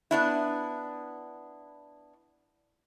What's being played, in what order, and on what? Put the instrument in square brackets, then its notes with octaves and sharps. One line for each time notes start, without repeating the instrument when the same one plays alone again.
[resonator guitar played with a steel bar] B3 D4 E4